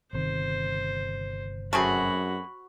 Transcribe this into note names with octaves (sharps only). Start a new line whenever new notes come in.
G1 C3 D#3 C5
F#2 A3 C4 F#4 G#4 B5